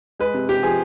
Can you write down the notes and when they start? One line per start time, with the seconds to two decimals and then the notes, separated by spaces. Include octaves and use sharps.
0.19 G#3 B4
0.34 C3
0.49 C3 G4
0.63 F3 G#4